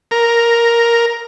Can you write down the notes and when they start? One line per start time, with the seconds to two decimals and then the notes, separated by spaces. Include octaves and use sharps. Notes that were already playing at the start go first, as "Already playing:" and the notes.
0.11 A#4